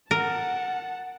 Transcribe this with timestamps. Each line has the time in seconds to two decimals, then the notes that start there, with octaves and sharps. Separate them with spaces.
0.11 A#4 F#5 A5